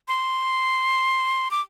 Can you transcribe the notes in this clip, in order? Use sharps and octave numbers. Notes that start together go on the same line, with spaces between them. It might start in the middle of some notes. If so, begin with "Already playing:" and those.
C6
D6